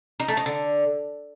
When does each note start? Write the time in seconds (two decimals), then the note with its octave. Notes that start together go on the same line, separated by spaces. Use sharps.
0.20 D#4
0.28 A3
0.37 D#4
0.46 D3